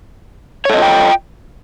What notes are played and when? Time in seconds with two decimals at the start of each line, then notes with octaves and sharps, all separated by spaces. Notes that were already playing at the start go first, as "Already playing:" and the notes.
0.65 C#5
0.70 A4
0.74 D#5
0.78 F4
0.82 G5